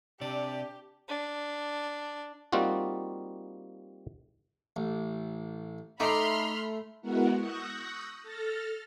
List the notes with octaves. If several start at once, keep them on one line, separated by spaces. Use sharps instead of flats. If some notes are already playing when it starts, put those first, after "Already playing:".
C3 D4 G4 D5
D4
G3 A#3 C4 D#4 F4 F#4
A1
A3 D#4 B5 C6 D6 F6
G#3 B3 E4 F#4 A#4 F#5
C#6 D#6 E6 F#6 G6 A#6
A4 F6 A6 A#6